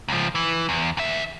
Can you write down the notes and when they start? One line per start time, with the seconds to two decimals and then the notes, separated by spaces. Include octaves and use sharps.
0.08 C#2 F3
0.35 E3
0.69 E2
0.97 D2 E5